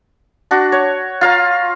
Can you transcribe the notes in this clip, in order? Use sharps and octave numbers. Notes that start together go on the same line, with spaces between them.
D4 F#4
C#5
F4 F5 A#5